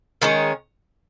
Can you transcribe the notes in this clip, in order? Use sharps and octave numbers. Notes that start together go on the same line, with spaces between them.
D#3 G#3 C#4